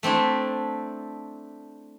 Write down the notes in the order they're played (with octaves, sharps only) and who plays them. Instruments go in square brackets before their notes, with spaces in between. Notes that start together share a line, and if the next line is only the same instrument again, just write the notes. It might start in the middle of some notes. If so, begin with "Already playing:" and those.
[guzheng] A3 C4 D4 E4